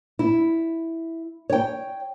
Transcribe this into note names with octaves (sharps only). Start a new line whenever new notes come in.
E4
C#5 G5